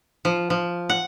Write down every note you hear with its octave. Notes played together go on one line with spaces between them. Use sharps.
F3
F3
F#5